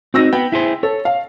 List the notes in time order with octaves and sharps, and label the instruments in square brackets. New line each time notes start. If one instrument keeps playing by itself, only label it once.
[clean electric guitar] C4 D#4 [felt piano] F#4 E6 A#6
[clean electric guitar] B3 B4 [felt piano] G5
[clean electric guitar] E4 G#4 C5
[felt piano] A4 [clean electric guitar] C#5
[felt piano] F5